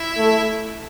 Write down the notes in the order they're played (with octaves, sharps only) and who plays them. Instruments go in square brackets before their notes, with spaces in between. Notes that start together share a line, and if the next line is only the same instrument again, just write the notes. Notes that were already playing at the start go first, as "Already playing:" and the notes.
Already playing: [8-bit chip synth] E4 E5
[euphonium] A3